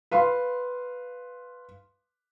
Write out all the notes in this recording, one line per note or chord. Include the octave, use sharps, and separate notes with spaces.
B4 F5 C6